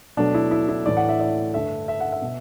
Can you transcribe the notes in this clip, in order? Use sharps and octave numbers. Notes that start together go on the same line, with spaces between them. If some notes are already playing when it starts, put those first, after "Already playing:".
B2 F#3 A3 D4
E4
E4
E4
A2 E3 A3 D5
F#5
E5
D5
G2 D3 A3 E5
E5
F#5
E5
B2